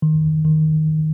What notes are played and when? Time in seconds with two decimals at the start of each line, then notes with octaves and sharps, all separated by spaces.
0.02 D#3
0.45 D#3